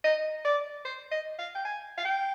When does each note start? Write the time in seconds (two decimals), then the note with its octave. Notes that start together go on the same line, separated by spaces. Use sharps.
0.04 D#5
0.45 D5
0.85 C5
1.12 D#5
1.39 F5
1.55 G5
1.65 G#5
1.98 F5
2.05 G5